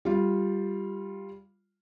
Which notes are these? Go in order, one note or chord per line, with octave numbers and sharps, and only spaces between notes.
G3 F4